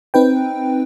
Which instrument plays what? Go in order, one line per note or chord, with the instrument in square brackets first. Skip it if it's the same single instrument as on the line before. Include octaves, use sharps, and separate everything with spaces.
[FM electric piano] C4 D#4 B4 G5